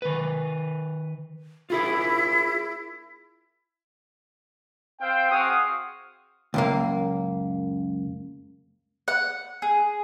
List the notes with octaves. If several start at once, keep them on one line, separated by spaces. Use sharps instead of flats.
D#3 B4
E4 F4 G#4 A#4
C4 C5 F5 G5
C4 F#4 G#4 F5 F#5 D#6
C#2 F#2 A#3
F#5
G#4